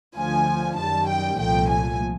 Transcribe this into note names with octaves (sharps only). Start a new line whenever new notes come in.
D2 D3 F3 G#5
F#2 D#3 G3 A5
G5
C2 A#2 F3 A3 G5
G#5